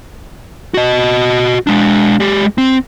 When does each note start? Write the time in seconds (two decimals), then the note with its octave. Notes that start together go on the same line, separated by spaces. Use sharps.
0.74 F#4 D#5
1.67 G#3 D4
2.20 G#3 G4
2.58 C4